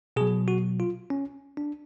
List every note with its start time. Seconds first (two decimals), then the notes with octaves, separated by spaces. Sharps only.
0.16 B2 F#3 G#4
0.48 F#4
0.80 F4
1.10 C#4
1.57 D4